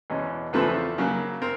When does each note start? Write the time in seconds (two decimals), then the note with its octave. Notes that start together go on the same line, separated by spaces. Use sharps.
0.10 E2 B2 G#3 C#4
0.53 E2 C#3 F3 A3 C4 A4 B4
0.98 C#3 F#3 A#3
1.42 C4 A#4